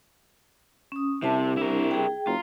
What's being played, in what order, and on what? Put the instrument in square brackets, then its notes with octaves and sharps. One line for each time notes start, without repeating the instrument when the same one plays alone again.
[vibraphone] C#4 D#6
[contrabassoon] C2 [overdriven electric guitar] C3 [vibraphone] E5 A5
[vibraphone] D4 [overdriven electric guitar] E4 A#4
[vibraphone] G#4 G5
[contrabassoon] F#1 [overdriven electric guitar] F4 [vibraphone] A#5